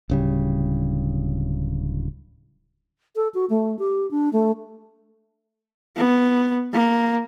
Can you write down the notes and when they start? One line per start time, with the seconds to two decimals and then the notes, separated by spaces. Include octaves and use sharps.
0.10 D1 C#3 G3
3.16 A4
3.34 F#4
3.50 A3
3.79 G4
4.11 D4
4.33 A3
5.97 B3
6.73 A#3